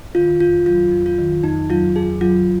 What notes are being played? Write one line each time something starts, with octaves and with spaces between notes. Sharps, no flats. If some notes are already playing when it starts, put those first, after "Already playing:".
D#3 F4
F2 F4
F#3 F4
F2
F4
D#3
F2 D#4
F#3 F4
F2 G#4
F#3 F4